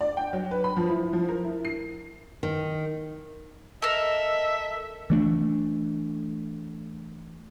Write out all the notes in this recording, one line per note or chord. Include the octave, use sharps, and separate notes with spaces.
D5
G5
F#3
B4
B5
F3
E4
F3
A#4
E4
C7
D#3
A4 A#4 D#5 E5
E3 A3 D4